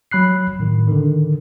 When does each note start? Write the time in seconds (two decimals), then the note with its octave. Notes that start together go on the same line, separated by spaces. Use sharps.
0.11 F#3 B5 F#6 C7
0.59 A2 D#3
0.87 D3 D#3